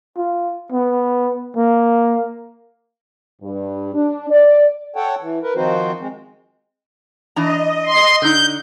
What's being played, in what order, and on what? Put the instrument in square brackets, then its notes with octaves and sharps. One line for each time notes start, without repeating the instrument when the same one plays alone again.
[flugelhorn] F4
B3
A#3
[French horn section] G2
D4
D5
[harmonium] A4 C#5 F#5 G5 A5
E3
A#4 B4
D#3 F3 C4 D#4 F#4 C5
G#3 C4
[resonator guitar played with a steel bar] E3 D4 A#5 [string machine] D#5
[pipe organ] C6
[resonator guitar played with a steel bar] D3 D#4 [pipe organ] G6